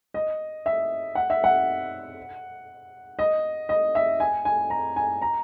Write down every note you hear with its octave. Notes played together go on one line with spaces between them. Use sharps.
D#5
E5
F#5
E5
F#5
D#5
D#5
E5
G#5
G#5
A#5
G#5
A#5